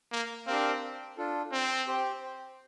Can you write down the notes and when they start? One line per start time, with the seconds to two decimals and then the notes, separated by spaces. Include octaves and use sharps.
0.12 A#3
0.47 C4 D4 G4 A#4 F5
1.17 D4 F4 A4
1.52 C4
1.87 G4 C5 G5